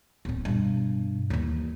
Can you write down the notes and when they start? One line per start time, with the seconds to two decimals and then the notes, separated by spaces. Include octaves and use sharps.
0.25 D1 C4
0.45 G2 B2
1.30 D#2 E3